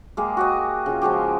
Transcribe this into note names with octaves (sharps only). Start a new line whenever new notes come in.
G#3 A#3 G4
F#4 G4 D#5
C#3 F4
F3 G#3 F#4 G4